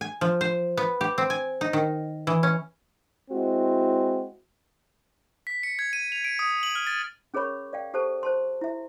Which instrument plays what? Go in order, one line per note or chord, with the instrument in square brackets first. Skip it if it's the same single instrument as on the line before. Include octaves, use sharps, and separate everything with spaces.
[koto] G#5
F3
C5
B3
G4
C4
G#5
D#4
D#3
E3
C#4
[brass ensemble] G#3 C4 E4 F#4
[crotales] B6
C#7
G#6
D#7
F7
D7
D#6
F#7
F6
A6
[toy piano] C#4 G#4 A#4 C#5 B5 C#6
D5 F5 G5
G4 A4 C5 A5 C#6
C5 A5 C6
E4 E5